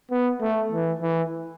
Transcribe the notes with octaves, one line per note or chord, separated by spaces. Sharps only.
B3
A3
E3
E3